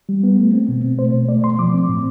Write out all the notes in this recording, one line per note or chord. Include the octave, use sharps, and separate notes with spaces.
G3
B3
A3
C4
B2
B2
A3 C5
B2
A3 D5
B2 C6
F3 D6
C4
A2